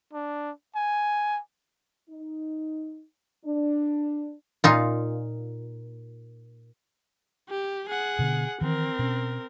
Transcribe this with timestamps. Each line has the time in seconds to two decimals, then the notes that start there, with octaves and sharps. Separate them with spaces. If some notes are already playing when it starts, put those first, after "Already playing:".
0.13 D4
0.75 G#5
2.10 D#4
3.45 D4
4.64 A#2 D#4 F4
7.50 G4
7.89 G#4 F#5
8.19 B2 D3 B3
8.61 D#3 E3 C4 A#4
8.99 B2 C#4